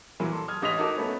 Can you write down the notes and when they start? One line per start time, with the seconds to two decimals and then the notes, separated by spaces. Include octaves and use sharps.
0.20 A#2 E3 F#3 A#3
0.32 A4 C6
0.48 D#6 F6 G#6
0.62 A1 D#5 D#6 G#6 B6 F7
0.78 D#4 F#4 A4 A#4 A5 D6
0.96 A3 B3 C#4